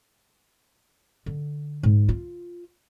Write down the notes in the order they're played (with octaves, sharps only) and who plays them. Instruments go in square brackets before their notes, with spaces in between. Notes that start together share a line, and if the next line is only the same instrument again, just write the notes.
[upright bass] D3
G#2
F4